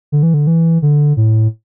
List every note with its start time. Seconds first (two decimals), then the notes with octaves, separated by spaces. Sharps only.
0.12 D3
0.23 E3
0.34 D3
0.47 E3
0.82 D3
1.17 A2